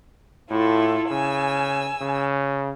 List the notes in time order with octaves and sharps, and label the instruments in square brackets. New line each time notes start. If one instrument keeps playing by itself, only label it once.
[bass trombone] A2 [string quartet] E4 F4 A4
[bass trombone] C#3 [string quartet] G#5 E6
[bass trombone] C#3